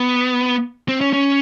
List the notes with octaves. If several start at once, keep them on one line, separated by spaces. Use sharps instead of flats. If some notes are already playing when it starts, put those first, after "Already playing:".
Already playing: B3
C4
C#4
C#4